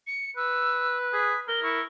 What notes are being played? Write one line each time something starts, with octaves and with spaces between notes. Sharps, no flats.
C#7
B4 E6
G#4 B6
A#4 G7
E4 C#6